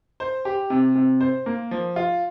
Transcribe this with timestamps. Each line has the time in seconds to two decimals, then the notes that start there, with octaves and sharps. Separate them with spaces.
0.20 C5
0.45 G4
0.70 C3
0.95 C3
1.21 C5
1.46 A#3
1.71 F3
1.96 F4